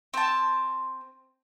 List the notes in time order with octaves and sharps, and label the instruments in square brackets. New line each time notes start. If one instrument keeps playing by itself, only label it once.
[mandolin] C4 A5